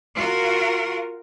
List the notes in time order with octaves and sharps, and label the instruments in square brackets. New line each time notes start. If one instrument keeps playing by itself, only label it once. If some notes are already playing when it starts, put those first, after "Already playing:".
[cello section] F4 F#4 A#4